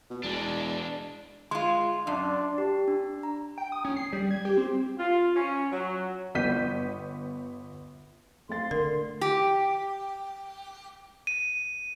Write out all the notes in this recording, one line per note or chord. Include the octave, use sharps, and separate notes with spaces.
B2
E1 G#3 D4 D5
G#3 F4 C6
F#2 D4
G4
D4
A#5
G5
D#6
C#4
C7
G3
G#6
G4
C4
F4
C#4
F#3
G1 B3 G6 B6 D#7
A3 F5 C6 A6
D3 A#4
G4
D#7